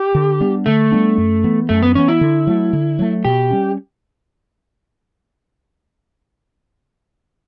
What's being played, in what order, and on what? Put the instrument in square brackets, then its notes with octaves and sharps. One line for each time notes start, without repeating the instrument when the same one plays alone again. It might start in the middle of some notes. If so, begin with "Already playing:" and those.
Already playing: [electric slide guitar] G4
[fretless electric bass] D3
G3 B3 D4
[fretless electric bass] D3 [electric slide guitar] A3
[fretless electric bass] G3 B3 D4
F#2
E3 B3
[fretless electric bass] F#2 [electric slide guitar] A3
[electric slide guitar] B3
[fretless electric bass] E3 B3 [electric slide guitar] C#4
[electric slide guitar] E4
[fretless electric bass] D3
F#3 A3
D3
F#3 A3
[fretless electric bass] B2 [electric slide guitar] G4
[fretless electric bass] G3 C#4